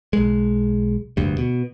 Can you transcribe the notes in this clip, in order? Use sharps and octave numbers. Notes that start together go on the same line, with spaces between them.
B1 G#3
F1 D2 G2
B2